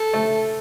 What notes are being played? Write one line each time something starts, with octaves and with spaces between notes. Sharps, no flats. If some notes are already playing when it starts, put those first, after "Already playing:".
Already playing: A4
A3